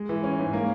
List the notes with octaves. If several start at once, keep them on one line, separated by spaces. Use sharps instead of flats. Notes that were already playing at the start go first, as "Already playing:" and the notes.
Already playing: G#3
E3
C#4
G#2
A#3